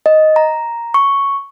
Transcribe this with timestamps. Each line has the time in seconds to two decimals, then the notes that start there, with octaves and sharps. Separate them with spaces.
0.06 D#5
0.36 A#5
0.94 C#6